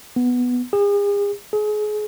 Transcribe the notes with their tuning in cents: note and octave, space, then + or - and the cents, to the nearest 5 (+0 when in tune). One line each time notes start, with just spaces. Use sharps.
B3 +0
G#4 -40
G#4 +30